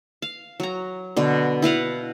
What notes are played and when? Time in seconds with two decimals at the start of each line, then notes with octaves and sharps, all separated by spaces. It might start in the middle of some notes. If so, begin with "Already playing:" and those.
0.22 F5
0.60 F#3 A#5
1.17 B2 D3
1.62 E4 B4 F5 F#5